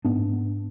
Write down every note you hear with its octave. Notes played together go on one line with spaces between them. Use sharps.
G#2 B3 D4